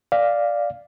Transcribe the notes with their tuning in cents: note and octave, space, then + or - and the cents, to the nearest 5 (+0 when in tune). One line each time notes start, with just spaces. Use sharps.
D5 +0 F5 +0